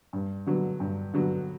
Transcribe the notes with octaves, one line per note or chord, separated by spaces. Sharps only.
G2
D3 F#3 B3
G2
D3 F#3 B3